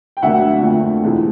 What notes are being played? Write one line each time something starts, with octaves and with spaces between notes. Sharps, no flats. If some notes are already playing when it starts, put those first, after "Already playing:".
G5
D2 D3 F#3 A#3 E5 F#5
F2 D3 F3 A3
E2 C3 F3 G#3